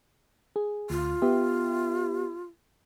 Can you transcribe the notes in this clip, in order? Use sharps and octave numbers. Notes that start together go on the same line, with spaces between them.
G#4
D2 F4
B3 G4 E5